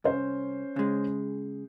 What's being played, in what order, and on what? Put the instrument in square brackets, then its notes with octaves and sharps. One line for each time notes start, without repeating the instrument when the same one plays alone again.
[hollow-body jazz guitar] C2 [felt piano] C#4 C5
[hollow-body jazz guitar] C#3 G#3